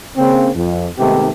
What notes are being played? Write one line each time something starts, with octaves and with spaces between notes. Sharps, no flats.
C#3 A#3 C4
F2
G#2 C3 D#3 A3 B3 G4